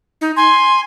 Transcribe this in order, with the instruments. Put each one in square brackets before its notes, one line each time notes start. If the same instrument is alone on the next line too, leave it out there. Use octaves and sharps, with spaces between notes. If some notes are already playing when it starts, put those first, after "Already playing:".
[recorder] D#4
[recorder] G#5 [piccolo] C6